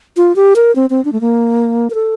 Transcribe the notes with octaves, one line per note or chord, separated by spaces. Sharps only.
F4
G4
A#4
C4
C4
D4
A3
A#3
A#4
A4